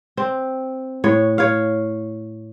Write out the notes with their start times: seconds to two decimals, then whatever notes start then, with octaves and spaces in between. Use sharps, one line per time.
0.17 C4
1.04 A2 C#5
1.38 C#5 F5